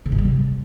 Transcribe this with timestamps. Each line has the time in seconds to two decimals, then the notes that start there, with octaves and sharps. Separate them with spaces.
0.06 C#3
0.12 G#2
0.18 G3
0.25 C3